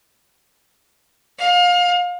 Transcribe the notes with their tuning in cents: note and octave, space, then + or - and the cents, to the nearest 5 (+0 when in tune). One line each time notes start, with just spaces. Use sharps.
F5 +30